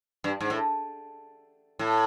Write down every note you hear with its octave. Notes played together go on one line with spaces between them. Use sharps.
G2
G#2
A2
A2